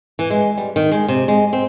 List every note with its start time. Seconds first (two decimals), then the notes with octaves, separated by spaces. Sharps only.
0.19 E3
0.30 G#3
0.58 G3
0.76 D#3
0.92 G#3
1.09 C3
1.28 G#3
1.53 C4